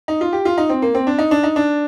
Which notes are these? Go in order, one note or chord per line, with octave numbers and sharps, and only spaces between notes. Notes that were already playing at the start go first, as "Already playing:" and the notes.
D#4
F4
G4
F4
D#4
C4
A#3
C4
D4
D#4
D4
D#4
D4